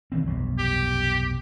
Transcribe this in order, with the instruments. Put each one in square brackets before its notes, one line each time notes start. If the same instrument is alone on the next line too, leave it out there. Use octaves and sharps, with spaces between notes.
[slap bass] D#3 E3 C4
F1 B1 G2
[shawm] G4